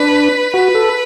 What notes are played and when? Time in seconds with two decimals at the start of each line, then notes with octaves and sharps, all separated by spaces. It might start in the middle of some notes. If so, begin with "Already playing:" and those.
Already playing: D4 B4
0.54 F#4 B4
0.75 A4